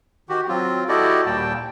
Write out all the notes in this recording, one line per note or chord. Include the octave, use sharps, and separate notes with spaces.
D#3 F#4 G4
F#3 C4 F4
E4 F#4 G4 A4 D5 D#5
D#2 A#2 G3 A#3 G5 A5